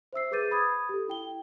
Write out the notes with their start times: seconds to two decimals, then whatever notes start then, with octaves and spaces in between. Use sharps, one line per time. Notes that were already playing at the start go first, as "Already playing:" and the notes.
0.13 C5 E5 E6 C7
0.31 G#4 B4 D6 G6 A6 D#7
0.51 B5 D#6 G#6
0.89 G4 A4
1.08 E4 G5 G7